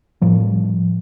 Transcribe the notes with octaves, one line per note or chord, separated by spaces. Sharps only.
A2 F3 G3